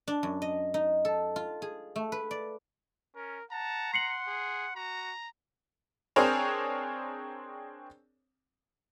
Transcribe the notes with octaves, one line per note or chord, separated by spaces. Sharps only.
D4
F#2
D#5
D#4
A4
F4
G#4
A3
B4
D5
C#4 A#4
F#5 A5 A#5
F#5 C6 C7 C#7 F#7
G#4
F#4 A#5
C4 D4 G#4 A#4 C5 C#5